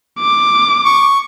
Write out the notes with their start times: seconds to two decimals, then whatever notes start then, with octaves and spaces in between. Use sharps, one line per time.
0.20 D6
0.85 C#6